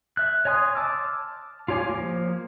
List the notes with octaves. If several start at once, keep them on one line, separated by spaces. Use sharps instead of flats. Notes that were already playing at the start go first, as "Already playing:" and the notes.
E5 F#6
C#5 D#5 G#5 C6 D#6
A5 D6 E6 F6
F4 G4 C#5 G#5 D6
F3 A#3